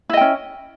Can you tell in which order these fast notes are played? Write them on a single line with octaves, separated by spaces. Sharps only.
E4 D#5 G5 C#4